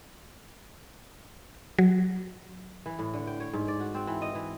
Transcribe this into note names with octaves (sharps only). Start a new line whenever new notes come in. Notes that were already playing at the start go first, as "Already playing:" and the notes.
F#3
E3
A2
D3
G5
C#5
G#2
D5
F#4
C4
E3
D#5
E3